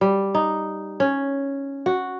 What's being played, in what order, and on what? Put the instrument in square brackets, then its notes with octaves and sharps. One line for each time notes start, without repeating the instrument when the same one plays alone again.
[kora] G3
D#4
C#4
F#4